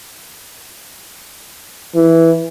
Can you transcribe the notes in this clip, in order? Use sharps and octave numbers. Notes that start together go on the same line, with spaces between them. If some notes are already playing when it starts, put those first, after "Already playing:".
E3